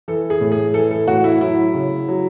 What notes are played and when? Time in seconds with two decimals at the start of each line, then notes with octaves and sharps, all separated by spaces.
0.08 E3 A4
0.30 G#4
0.41 A2
0.52 G#4
0.74 E3 A4
0.91 A4
1.08 A2 F#4
1.24 E4
1.41 F#3 E4
1.74 C#3
2.08 F#3